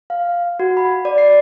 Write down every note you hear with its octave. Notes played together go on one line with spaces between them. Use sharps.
F5
F#4
B5
D5
C7